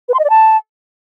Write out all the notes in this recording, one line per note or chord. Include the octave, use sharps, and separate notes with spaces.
B4
C6
D#5
D5
A5